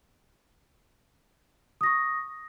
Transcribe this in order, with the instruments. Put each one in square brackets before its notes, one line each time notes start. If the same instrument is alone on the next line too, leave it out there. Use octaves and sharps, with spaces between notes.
[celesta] D#6
A#6
C#6